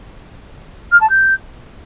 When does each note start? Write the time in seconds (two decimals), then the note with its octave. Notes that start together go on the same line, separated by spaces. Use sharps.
0.92 F6
1.00 A5
1.09 G6